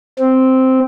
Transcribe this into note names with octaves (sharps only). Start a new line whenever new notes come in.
C4